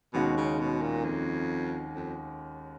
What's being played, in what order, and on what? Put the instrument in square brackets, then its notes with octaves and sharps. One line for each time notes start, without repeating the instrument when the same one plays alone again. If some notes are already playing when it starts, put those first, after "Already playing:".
[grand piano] D#2 D#3 G#3 C#4 F#4 [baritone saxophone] B2
[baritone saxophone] C#3
B2
A#2
F2
F2